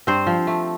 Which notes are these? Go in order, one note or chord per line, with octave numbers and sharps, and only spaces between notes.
G2 C4 C5
F3
A3